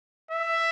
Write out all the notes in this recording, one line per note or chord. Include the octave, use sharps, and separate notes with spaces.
E5